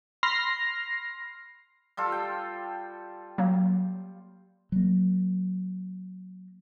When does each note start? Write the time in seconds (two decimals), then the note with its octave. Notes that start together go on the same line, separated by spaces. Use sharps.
0.23 B5 C6 F6 A#6 C7
1.97 G3 F4 A4
2.12 G5
3.38 F#3 A#3
4.72 F#3 A#3